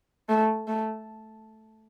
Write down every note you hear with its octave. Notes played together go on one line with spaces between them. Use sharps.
A3
A3